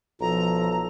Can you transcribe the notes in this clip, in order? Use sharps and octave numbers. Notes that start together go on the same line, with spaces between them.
B1 F3 A4 A#5